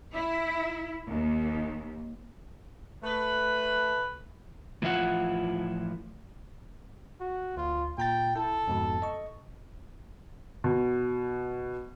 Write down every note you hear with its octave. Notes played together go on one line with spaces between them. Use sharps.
E4
D#2
A3 B4
A2 E3 F3 E4 F4 F#5
F#4
D2 F4
A#2 G5 A#5 A6
E4 A4
F2 G#2 B2
D#5 C#6
B2